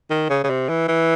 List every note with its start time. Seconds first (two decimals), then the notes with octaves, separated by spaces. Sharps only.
0.10 D#3
0.30 C#3
0.44 C#3
0.50 C3
0.69 E3
0.88 E3